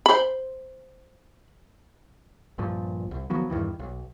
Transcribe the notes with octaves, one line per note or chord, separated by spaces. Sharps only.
C5 B5
A#1 G2 A#2 F3
C2
D#3 F3 F#3 B3
E2 G2 D#3 E3
B1